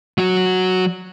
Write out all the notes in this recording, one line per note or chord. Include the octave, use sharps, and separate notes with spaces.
F#3 F#4